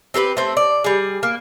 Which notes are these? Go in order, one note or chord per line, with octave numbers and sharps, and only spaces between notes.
C4 G4 A4 B4
A3 C4
D5
G3 G#4
A#3